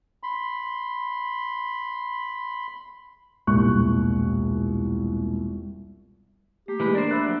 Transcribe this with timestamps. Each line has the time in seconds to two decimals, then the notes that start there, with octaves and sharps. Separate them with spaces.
0.23 B5 C6
3.47 E1 C2 A#2 C#6 F#6
6.68 A3 A#3 G4
6.80 E3 G#3 B4
6.95 D4 A#4 C5 D5
7.11 E5 B5 E6 F#6
7.22 F3 F#3